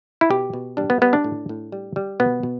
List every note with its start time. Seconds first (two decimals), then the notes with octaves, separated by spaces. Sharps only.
0.21 E4
0.30 B2 G4
0.53 B2
0.77 G3 D4
0.90 B3
1.01 G3 B3
1.13 D4
1.24 A2
1.49 A2
1.72 G3
1.96 G3
2.20 B2 B3
2.43 B2